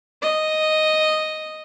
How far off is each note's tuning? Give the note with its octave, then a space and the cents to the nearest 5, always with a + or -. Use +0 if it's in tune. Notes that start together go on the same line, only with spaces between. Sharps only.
D#5 +0